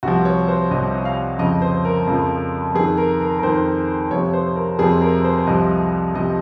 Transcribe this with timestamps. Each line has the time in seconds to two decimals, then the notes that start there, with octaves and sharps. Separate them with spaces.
0.03 C2 C3 F3 F#4
0.25 C#5
0.48 C5
0.71 C2 C3 F3 D#5
1.05 F5
1.39 F2 C#3 F3 D#5
1.62 C5
1.85 A#4
2.07 F2 C#3 F3
2.75 F2 G#4
2.79 D#3
2.97 A#4
3.20 A#4
3.39 A#4
3.43 F2 D#3 C5
4.11 F2 C3 F3 C#5
4.33 C5
4.56 A#4
4.79 F2 C3 F3 G#4
5.02 A#4
5.24 C5
5.47 C2 C3 F3 D#5
6.15 C3 F3 D#5